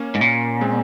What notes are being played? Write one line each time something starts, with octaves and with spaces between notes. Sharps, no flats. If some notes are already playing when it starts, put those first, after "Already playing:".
Already playing: A#3 C#4
G#2
A#2
G#3 C4